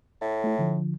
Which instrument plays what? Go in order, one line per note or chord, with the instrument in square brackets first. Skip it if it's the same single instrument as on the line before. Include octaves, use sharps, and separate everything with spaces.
[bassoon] A2
[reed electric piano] A3 E4
D3 F3